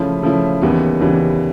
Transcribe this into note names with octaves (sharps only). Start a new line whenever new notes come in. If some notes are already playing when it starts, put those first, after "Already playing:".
Already playing: C#3 F3 A3 C#4 E4
C#3 F3 A3 C#4 E4
D#2 C#3 E3 G3 B3
D#2 C#3 E3 G3 B3